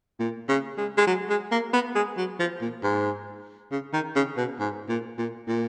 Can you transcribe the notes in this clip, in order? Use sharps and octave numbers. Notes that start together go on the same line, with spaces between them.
A#2
C#3
G#3
G#3
F#3
G#3
A#3
B3
G#3
F#3
F3
A#2
G#2
C#3
D#3
C#3
B2
G#2
A#2
A#2
A#2